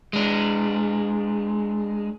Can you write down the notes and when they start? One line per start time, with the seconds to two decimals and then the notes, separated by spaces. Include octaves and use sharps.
0.13 G#3 D4